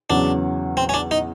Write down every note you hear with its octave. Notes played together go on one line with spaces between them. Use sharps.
E2 C#3 F#3 D4
C4
C#4
D4
D#4